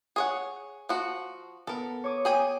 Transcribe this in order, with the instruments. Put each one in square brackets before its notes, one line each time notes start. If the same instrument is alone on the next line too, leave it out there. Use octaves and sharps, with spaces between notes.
[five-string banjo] G#4 C#5 F#5
F3 F#4
[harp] B3 [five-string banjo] A4 A#4
[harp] C#5 D6 D#6
[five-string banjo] G#4 G5 G#5